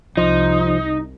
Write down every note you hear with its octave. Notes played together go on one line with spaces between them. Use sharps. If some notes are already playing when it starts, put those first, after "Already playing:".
C2 F3 D#4